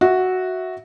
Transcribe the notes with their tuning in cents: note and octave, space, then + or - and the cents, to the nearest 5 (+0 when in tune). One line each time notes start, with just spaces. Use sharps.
F#4 +0 E5 -10